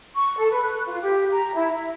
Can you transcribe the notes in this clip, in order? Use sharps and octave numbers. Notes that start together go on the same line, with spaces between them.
C#6
A4
B4
F#6
F4
G4
A#5
E4
E5